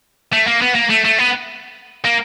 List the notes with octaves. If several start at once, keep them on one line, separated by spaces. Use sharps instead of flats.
A3
A#3
B3
A#3
A3
A3
B3
A#3